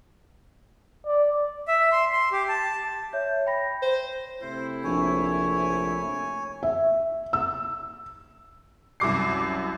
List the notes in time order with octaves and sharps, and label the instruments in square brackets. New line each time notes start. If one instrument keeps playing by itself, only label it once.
[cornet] D5
[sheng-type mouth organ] E5
C6
C6
G4
A5
[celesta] C#5 E5 G6
G5 B5 A#6
[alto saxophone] C5
[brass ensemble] C3 A3 E4 [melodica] C5
[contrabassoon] A#1 [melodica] C#5 G#5
[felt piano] E5
E6
[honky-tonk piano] C2 F#2 D6 C7